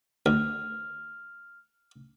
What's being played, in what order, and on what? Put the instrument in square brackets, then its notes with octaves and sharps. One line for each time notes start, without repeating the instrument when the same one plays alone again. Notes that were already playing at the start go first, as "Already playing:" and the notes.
[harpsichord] D2 [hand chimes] F6